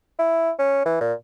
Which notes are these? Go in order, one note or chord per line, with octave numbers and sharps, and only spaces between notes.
E4
C#4
E3
A#2